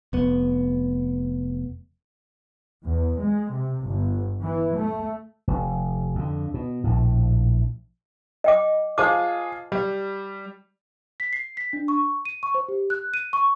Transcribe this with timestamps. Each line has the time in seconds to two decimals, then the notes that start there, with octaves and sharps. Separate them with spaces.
0.13 F1 B3
2.84 E2
3.20 G#3
3.51 C3
3.86 G1
4.40 E3
4.77 A3
5.47 F1
6.15 F2 D3
6.54 B2
6.84 A#1 A2
8.44 D#5 G5 D6
8.98 F4 G#4 C5 A5 D6
9.72 G3
11.20 B6
11.33 C7
11.57 B6
11.73 D4
11.88 C#6
12.25 D#7
12.43 C#6
12.55 C5
12.68 G4
12.90 F#6
13.14 D#7
13.33 C#6